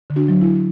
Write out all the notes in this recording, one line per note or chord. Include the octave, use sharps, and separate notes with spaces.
D3
D4 F#4
F#3
E4